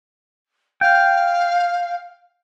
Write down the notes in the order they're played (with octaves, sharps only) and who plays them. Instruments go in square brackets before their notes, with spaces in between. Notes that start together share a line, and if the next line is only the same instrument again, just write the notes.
[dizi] F5 [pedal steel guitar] G5